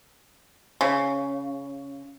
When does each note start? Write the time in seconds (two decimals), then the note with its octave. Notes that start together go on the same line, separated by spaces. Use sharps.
0.81 C#3